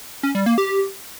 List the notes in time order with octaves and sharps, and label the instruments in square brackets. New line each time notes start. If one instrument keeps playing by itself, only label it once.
[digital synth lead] C#4
G3
A#3
G4